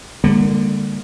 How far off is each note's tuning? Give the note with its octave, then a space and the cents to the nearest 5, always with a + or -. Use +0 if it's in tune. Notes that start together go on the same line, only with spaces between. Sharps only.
D3 +10 G3 +45 A#3 -5